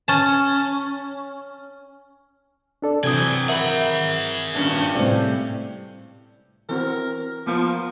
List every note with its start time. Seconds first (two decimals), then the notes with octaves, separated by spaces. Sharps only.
0.08 C#4 A5
2.82 D4 A4 D5
3.04 C3 E3 F#3 C4 G5 G#5 D#6
3.48 G#4 A#4 E5 F#5 B5
4.54 G2 A#2 C#4
4.95 A2 C3 G3
6.69 E3 C4 F#4 A#4
7.47 F3 A#3 B3 A#4